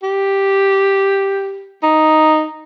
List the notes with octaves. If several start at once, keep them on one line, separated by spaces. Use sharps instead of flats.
G4
D#4